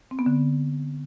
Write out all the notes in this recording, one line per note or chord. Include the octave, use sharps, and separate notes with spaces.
C4
B3
D3